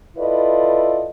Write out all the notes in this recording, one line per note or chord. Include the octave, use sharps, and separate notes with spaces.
E4 F4 A4 B4 D5 D#5